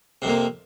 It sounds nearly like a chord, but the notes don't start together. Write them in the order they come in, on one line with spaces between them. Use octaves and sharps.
C3 F2 A#3